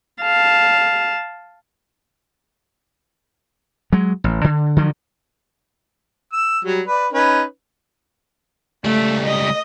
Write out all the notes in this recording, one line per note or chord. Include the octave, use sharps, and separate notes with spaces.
F5 A5
F#3 G#3
A1
D3
D3 D#3 F3 F#3
E6
F#3 G3
B4 D5
C#4 D#4 B4
C#2 G3 A3
D#5